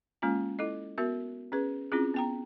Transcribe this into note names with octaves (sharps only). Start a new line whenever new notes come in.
G#3 A#3 C#4 F4 G#5
E4 A4 D#5
B3 F#4 A#4 E5
C#4 G#4 B4
C4 C#4 E4 F4 G#4
B3 G5 A#5